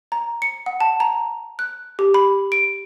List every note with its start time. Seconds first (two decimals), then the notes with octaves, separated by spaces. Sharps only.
0.12 A#5
0.42 C#7
0.66 F#5
0.81 A5
1.00 A#5
1.59 F#6
1.99 G4
2.14 B5
2.52 D7